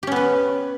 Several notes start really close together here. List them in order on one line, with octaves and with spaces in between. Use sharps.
G4 C#4 B3 B4